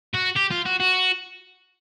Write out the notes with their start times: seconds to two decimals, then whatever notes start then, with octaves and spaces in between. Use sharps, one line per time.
0.15 F#4
0.36 G4
0.51 F4
0.66 F#4
0.80 F#4